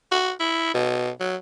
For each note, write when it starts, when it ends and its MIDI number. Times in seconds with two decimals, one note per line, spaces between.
0.11 0.32 66
0.40 0.71 64
0.74 1.10 47
1.20 1.36 54